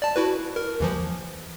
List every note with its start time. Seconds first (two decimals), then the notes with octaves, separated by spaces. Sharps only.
0.02 D5 A5
0.16 E4 F#4 B4
0.56 A#4
0.80 D#2 E3 F3